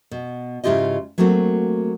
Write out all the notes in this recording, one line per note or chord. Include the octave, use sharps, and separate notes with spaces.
B2
G#2 C#3 E4 F4 G4 D#5
F#3 A3 A#3 C4 F#4